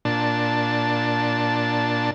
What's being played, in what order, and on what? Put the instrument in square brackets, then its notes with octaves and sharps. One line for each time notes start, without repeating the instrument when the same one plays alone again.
[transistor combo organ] A#2 D4 A5